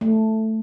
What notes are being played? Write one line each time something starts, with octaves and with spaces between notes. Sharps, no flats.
A3